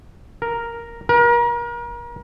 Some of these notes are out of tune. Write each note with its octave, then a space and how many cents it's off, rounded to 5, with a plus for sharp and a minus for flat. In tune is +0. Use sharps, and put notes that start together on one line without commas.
A#4 +0
A#4 +35